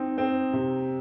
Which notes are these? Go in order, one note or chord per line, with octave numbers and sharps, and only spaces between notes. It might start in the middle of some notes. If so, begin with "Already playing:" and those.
Already playing: C4 D#4
C4
C3